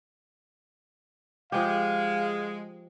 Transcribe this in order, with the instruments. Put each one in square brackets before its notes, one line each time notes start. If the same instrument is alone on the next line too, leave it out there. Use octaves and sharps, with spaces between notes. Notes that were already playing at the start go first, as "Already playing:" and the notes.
[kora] F3 G4 [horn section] G#3 [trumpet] F5